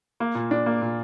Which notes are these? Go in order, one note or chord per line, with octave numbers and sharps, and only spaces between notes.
A#3
A#2
D4
A#3
A#2